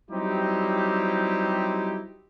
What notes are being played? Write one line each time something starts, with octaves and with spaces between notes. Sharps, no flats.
F#3 G3 C4 D#4 E4 G4